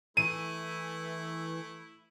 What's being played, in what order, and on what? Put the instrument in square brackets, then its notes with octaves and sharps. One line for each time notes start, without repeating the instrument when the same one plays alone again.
[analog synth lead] E3 [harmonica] A3 E4 [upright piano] D#7